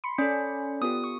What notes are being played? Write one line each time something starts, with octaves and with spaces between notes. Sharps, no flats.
B5 C6 C#7
C#4 A4 D5
B3 F4 G4 D#6
C#6